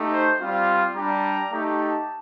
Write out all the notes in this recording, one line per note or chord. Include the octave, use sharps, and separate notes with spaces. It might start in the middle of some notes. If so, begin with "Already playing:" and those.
Already playing: A3 D#4 G4
C5
G3 C4 F4
G3 D4 G4 A#5
A3 D#4 G4
A5